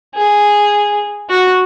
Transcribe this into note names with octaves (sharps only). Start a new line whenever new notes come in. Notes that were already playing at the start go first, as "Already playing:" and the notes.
G#4
F#4